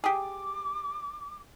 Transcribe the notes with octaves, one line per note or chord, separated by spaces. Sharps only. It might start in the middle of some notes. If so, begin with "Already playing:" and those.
G4 G#4 D6